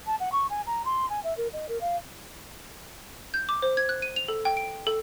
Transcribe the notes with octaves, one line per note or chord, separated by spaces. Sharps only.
A5
F#5
C#6
G#5
A#5
C6
G#5
E5
A#4
D#5
A#4
F5
G6
D6
C5
G#6
F#6
D#7
F7
A4
G5
D7
A4